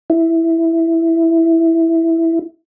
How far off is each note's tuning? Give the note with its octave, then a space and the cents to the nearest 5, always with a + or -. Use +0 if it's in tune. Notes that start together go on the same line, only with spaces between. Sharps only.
E4 +0